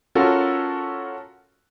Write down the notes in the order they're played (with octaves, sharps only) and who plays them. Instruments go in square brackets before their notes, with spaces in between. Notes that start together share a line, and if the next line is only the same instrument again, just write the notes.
[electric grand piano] C#4 F4 F#4 A4 A#4